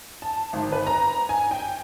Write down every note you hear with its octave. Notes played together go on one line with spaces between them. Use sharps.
A5
G#1
B4
A#5
G#5
G5